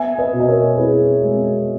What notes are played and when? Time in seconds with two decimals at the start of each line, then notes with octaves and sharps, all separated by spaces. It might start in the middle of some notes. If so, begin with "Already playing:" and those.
Already playing: B3 E5 G#5
0.18 B4 D#5
0.33 B2
0.40 D#5
0.48 A#4 C#5
0.78 E4 G#4 B4
1.23 G#3